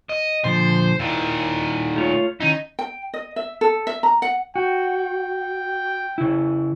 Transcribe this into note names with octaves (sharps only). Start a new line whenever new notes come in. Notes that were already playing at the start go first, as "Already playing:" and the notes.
D#5
A#2 D3 F3 C5
A#2 D#3 E4
A3 F4 C#5
D#3 C#4 D#4 E4
G5
D#5
E5
A4
E5
A#5
F#5
F#4 G5
C#3 E4